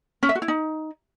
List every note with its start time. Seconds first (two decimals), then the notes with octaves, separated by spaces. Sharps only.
0.23 C#4
0.29 E5
0.35 F#4
0.42 E4
0.48 D#4